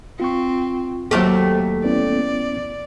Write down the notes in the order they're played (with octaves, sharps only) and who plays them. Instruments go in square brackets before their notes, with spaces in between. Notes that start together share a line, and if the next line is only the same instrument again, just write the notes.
[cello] C4 [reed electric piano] F4 C#6
[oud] D#2 A3 G4 [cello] F#3 [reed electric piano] A4 C5
[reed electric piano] B3 C#4 E4 [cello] D5